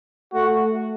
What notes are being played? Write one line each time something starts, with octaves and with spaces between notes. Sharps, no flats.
A3 F#4